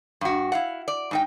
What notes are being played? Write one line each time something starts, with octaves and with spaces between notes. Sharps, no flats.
G2 F#4
E4 F5 F#5
D5
G#2 D#4 G5